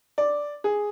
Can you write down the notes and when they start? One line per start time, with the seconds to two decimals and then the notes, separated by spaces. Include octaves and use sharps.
0.18 D5
0.64 G#4